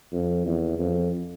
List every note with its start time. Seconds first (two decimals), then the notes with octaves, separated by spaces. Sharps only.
0.12 F2
0.46 E2
0.79 F2